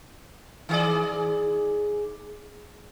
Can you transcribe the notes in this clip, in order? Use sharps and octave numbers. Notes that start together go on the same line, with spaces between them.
D#3 G#4 D5